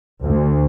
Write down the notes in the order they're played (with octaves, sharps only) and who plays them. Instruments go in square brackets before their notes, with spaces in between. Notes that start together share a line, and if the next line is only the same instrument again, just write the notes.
[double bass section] D2